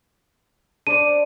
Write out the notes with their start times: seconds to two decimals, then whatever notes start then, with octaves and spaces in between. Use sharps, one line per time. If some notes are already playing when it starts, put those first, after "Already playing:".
0.87 D4 C5 D5 D#7